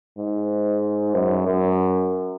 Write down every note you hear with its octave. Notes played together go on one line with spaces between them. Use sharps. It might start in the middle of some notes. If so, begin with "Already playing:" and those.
G#2
F#2
F#2